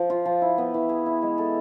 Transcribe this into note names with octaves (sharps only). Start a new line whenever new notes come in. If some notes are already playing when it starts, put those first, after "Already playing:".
Already playing: F3
F4
F3
E4
B3
E3
G#4
E4
G#3
A4